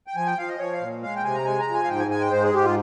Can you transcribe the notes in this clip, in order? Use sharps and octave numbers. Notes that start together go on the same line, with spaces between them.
G5
F3 G#5
G5
F3 F5
D#5
F3 C#5
F5
A#2
G#3 F5
G5
C3 G#5
A#5
G#3 G#5
A#5
F3
G#5
F5
G#2 G5
G#5
G#3 G#5
G5
G#2 C5
G#4
G#2 G4
F4